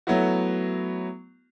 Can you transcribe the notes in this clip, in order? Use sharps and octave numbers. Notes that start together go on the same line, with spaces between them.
F#3 A3 B3 E4 F#4